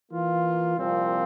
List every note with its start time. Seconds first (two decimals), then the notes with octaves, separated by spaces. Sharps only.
0.10 E3 A#3 F4
0.76 C2 A#2 F3 C4